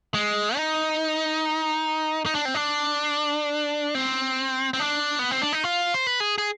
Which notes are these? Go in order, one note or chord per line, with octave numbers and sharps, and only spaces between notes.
G#3
D#4
D#4
D4
C4
D4
C4
C4
D4
B3
C4
D4
D#4
F4
C5
B4
G#4
G#4